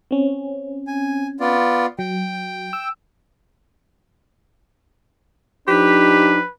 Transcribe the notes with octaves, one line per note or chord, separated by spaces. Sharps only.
C4 C#4
G#5
B3 F4 D5
F#3 G5
E6
F3 D4 D#4 G4 B4